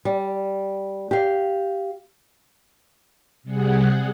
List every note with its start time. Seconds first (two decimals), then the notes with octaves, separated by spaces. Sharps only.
0.05 G3
1.11 G4 F5
3.43 C3 G3 G#4 F#5